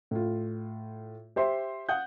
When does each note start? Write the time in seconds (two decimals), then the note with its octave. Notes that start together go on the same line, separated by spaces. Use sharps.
0.11 A2 F4
1.36 G4 C5 E5 C6
1.89 F#5 D#6 G6